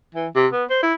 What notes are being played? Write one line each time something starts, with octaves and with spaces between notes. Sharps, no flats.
E3
C3
B3
C5
E4